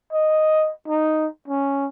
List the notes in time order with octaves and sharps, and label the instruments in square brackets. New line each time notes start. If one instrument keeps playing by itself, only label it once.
[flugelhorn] D#5
D#4
C#4